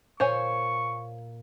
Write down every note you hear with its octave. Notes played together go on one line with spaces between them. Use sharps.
A#2 C5 C#5 G#5 C#6